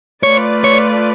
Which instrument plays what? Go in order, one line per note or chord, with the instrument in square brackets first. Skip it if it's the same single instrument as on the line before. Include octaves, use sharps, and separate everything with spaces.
[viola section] A3 F4 B4 D5 [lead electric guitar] C#5
[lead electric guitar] C#5